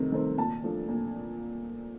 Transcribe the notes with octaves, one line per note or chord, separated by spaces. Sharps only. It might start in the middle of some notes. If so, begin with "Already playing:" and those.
Already playing: C3 D#3 A3 C4
D#3 A3 C4
A#2 A5
F3 A3 D4
A#2